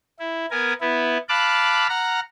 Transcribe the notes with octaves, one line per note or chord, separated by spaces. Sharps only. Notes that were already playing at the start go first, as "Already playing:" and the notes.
E4
B3 A#4 G#5
B3 E4
F5 A5 B5 D6 F#6
F#5 A#5 F6